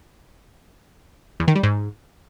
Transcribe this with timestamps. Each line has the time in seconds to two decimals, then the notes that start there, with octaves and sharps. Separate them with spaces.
1.40 E2
1.48 D#3
1.55 G3
1.63 G#2